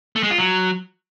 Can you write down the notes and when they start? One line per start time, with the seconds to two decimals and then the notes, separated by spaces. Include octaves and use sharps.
0.16 A3
0.23 G#3
0.31 F4
0.38 F#3